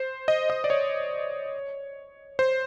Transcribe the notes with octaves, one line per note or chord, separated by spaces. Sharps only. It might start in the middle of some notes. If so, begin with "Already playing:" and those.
Already playing: C5
D#5
D#5
D5
C#5
C5